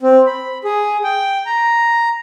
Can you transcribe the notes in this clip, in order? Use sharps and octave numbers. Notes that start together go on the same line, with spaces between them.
C4
B5
G#4
G5
A#5